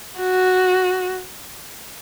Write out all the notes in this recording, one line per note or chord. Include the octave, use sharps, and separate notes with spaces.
F#4